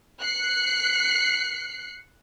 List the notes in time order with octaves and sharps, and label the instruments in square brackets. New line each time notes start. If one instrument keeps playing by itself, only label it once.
[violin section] F#6 C7 C#7